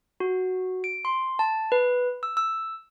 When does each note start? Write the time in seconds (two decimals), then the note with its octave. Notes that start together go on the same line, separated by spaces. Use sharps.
0.20 F#4
0.84 D7
1.05 C6
1.39 A5
1.72 B4
2.23 E6
2.37 E6